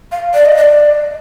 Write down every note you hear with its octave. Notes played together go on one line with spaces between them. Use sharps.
F5
D5
D#5
D5